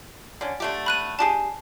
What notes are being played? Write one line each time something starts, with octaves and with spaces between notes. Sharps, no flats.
D3 C#4
D3 A3 G4
B5 F#6 D#7
D4 G4 G#4 A5